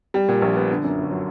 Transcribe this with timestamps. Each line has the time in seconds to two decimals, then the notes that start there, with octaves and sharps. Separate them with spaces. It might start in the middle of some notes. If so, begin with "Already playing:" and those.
0.14 G3
0.28 A#2
0.42 A#1
0.56 B3
0.70 D3
0.84 F#2
0.98 G1
1.11 F#3